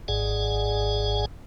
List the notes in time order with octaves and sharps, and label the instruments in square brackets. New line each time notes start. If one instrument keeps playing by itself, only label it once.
[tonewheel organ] G#1 G#2 G#4 D5 F#5 G#5